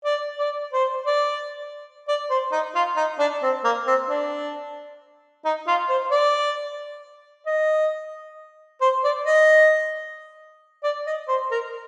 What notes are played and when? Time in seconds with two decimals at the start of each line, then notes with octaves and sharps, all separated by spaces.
0.05 D5
0.39 D5
0.73 C5
1.06 D5
2.08 D5
2.30 C5
2.52 D#4
2.75 F4
2.96 D#4
3.19 D4
3.43 C4
3.64 A#3
3.87 C4
4.09 D4
5.45 D#4
5.67 F4
5.89 C5
6.11 D5
7.46 D#5
8.81 C5
9.04 D5
9.26 D#5
10.83 D5
11.07 D#5
11.28 C5
11.51 A#4